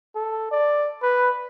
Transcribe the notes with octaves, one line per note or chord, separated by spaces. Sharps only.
A4
D5
B4